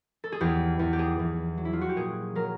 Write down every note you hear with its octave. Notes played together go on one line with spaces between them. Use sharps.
A4
G#4
E2 G4
E2
G4
G#4
E2
F#3
E4
F4
F#4
G4
A#2 G#4
F#3 A#4